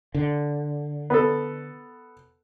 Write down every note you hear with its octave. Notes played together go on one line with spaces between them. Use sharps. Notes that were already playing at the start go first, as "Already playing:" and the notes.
D3
B3 A4